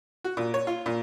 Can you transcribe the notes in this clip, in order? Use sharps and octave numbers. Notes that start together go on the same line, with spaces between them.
F#4
A#2
C#5
F4
A#2